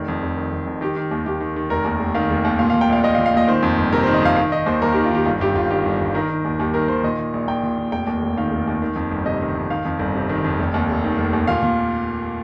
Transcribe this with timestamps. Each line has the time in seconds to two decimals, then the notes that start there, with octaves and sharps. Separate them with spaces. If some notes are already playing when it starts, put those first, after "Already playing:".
Already playing: F1 D#3
0.08 F2
0.22 F1
0.37 D#3
0.52 F1
0.66 F2
0.81 D#3 G4
0.96 D#3
1.11 D#2
1.26 D#2 G4
1.40 D#3
1.56 D#3
1.70 F1 A#4
1.85 D#2
2.00 F1
2.15 D#3 F5
2.30 F1
2.45 D#2
2.59 A#2 F5
2.70 F5
2.74 A#2
2.81 G5
2.89 A#1 F5
3.04 A#1 D#5
3.15 F5
3.18 A#2
3.26 F5
3.34 A#2 D#5
3.48 D#3 C5
3.63 F2
3.78 G1
3.93 C3 A#4
4.03 C5
4.07 D#3
4.14 D#5
4.22 F2 F5
4.36 D#3 F5
4.52 D#3 D#5
4.66 D#2 C5
4.82 D#2 A#4
4.92 G4
4.96 D#3
5.04 F4
5.11 D#3 G4
5.25 G1 F4
5.41 G2 G4
5.55 G1 F4
5.71 D#3 G4
5.85 G1
6.01 G2
6.14 D#3 A#4
6.30 D#3
6.45 D#2
6.59 D#2 G4
6.74 D#3 A#4
6.88 D#3 C5
7.04 A#2 D#5
7.19 A#2
7.34 A#1
7.48 A#1 G5
7.63 A#2
7.78 A#2
7.92 F1 G5
8.07 D#2
8.22 F1
8.37 D#3 F5
8.52 F1
8.67 D#2
8.82 D#3
8.96 F2
9.11 G1
9.26 C3 D#5
9.41 D#3
9.55 F2
9.70 D#3 F5
9.85 F2
9.99 G1
10.15 C3
10.29 D#3
10.44 F2
10.59 F1
10.74 D#2
10.89 F1
11.04 D#3
11.18 F1
11.33 D#2
11.47 A#2 F5
11.63 A#2